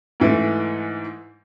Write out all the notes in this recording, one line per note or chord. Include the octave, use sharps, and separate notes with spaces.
G#2 E3 A3